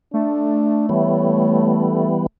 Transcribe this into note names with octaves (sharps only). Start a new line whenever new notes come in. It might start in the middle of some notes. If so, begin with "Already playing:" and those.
A3 D4
E3 G3 B3 C#5